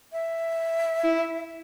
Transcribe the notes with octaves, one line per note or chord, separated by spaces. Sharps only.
E5
E4